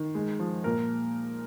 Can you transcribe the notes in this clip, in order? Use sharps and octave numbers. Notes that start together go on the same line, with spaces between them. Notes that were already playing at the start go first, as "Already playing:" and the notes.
Already playing: D#3
G#3
F3
A#2 A#4